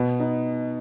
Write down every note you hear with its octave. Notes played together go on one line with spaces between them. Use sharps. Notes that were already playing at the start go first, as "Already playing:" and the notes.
Already playing: B2 B3
D#4